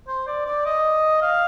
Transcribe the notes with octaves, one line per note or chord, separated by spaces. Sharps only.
C5
D5
D5
D#5
F5